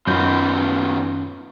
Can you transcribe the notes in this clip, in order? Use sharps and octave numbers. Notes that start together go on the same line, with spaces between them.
F#2 D#3 B3 C#4 F4 G6